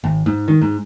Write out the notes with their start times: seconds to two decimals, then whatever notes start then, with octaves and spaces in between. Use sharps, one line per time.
0.04 G#1
0.26 G#2
0.48 D#3
0.62 G#2